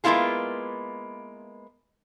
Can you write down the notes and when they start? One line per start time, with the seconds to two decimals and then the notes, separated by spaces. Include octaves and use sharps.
0.04 G#3 A#3 B3 E4 F4 G#4